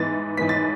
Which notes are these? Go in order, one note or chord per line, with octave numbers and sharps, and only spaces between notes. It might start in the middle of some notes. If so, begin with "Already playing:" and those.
Already playing: G#2 E3 B3 A6
G#2 E3 B3 B6
A6